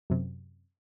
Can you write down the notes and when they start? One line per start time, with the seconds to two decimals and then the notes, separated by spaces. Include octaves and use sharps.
0.10 F#2 C3